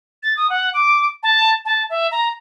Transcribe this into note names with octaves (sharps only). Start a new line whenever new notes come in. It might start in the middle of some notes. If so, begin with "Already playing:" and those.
A6
D#6
F#5
D6
A5
A5
E5
A#5